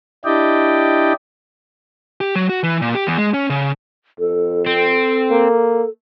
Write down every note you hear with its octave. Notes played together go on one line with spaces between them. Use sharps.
D4 E4 G4 D5 D#5 G5
G4
F#3
F#4
E3
A#2
G4
E2
G#3
C#4
C#3
F2 A4
C4 A4
A#3